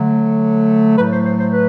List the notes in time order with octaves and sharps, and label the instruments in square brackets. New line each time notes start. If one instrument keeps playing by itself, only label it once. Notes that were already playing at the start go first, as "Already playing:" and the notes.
Already playing: [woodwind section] D3 F#3 A3
A2 F#3 A3 B4
C5
C5
C5
B4